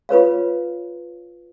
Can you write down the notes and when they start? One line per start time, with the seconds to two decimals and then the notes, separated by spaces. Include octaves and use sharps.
0.09 F4 B4 C#5 F5